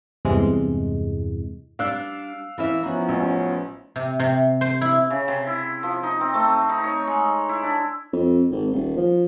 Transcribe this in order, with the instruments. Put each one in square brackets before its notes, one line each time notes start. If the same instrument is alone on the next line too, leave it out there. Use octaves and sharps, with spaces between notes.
[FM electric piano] E2 G2 C3 E3 G#3
[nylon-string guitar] G3 D4 D5 [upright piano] F5 E6 F#6
[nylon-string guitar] E3 C#4 E5
[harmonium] F3 B3 C#4 [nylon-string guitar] D#4 F#4
[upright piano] A1
[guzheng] C3
C3
C5
E4
[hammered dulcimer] C#3
C3
E4
F3
D#4
C4
A3
D#4
C#5
G#3
E4
D4
[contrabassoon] F2
G#1
D#1
F3